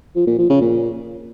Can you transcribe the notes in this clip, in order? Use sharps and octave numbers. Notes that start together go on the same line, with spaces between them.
F3
A#2
F3
C#3
A#2